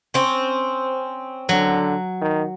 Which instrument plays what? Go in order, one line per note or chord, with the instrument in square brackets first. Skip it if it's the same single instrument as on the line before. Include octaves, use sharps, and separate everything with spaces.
[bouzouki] C4 C#4
[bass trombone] D3 [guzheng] F#3
[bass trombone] D#3